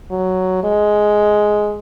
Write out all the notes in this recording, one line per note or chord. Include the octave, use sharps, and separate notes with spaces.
F#3
G#3